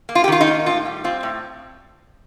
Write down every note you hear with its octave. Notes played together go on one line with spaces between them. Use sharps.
A#3
F4
G4
D#3 F4
D#4
A#3
A2 F4
G3
C4 F4
A2